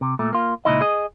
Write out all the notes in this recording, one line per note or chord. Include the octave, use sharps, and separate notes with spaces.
C3
A#2 A3
A#3 F4
C#2 A#2 D#4 E4 D#5
G#4 D#5